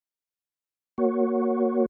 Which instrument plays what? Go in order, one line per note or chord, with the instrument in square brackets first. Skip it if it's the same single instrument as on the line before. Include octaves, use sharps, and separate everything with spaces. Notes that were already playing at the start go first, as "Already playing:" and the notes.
[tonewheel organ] A#3 F#4 C#5